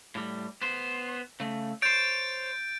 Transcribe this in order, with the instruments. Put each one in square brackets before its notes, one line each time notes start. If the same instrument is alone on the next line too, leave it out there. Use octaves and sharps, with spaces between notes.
[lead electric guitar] A2 G3
B3 C5
C#3 A3
[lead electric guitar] C5 C#5 [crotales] G6 A6 D7